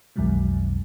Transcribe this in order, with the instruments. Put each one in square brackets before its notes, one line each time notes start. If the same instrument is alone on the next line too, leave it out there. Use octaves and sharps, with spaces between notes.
[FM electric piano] B1 F2 B2 D#3 F#3 G#3